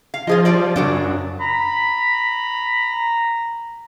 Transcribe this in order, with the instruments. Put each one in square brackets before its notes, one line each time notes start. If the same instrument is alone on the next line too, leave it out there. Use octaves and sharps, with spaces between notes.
[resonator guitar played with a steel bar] F5
[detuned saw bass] F3 [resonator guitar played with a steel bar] F4 G#4 D#5
[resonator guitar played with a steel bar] G3 F4 D5
[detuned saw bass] F#2 [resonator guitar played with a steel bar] C#3 F#3 D4
[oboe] A#5 [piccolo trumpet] B5